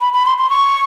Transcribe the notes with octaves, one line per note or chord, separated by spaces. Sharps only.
B5
B5
C6
C6
C#6